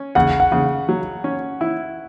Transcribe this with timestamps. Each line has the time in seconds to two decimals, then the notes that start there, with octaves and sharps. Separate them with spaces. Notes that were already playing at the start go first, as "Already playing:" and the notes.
Already playing: C#4
0.15 C#3 F#5
0.40 F#5
0.52 C#3
0.89 F#3
1.24 C#4
1.61 E4